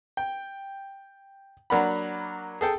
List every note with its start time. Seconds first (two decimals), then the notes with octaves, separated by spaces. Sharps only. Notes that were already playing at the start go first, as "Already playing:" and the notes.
0.17 G5
1.70 F#3 A#3 D4 F#5 B5
2.61 G#4 A4 G5